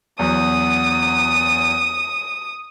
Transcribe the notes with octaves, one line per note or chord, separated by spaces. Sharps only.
E2 F#3 D#6